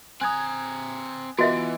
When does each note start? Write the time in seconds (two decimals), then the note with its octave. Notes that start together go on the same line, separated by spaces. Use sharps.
0.21 C4 G#5 A#5 D#6 F#6 G#6
1.38 E3 B3 F4 F#4 D#5 E5 D7